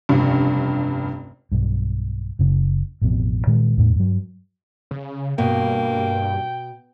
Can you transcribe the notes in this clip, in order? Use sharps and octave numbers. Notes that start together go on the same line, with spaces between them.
F1 C#2 G2
B1 G2
F#1 C#3
A1 F2 B2
A#2 D#3 G#3
E2 A2
G2 F#3
C#3
G2 B2 A#3 G5